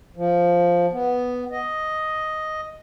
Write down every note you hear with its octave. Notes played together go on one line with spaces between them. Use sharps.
F3
B3
D#5